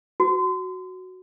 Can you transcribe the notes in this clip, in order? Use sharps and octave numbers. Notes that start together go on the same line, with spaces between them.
F#4